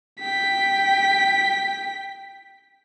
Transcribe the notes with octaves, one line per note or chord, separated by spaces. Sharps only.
G5 B6